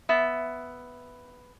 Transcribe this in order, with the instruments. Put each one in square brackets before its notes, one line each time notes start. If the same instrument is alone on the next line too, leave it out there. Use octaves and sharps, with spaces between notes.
[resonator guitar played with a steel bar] B3 E5